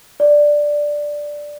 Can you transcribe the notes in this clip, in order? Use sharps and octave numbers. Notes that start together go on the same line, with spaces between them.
D5